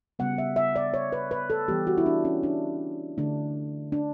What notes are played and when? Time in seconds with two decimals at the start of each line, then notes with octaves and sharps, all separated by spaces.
0.19 C#3 G3 B3 F#5
0.38 E5
0.56 E5
0.76 D5
0.94 C#5
1.12 B4
1.31 B4
1.50 A4
1.68 E3 G3 B3 G4
1.87 F#4
1.97 E4
2.06 D4
2.25 C#4
2.43 D4
3.18 D3 A3 D4
3.92 D4